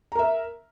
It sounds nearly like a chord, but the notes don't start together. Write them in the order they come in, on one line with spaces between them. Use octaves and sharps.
A#5 A#4 E5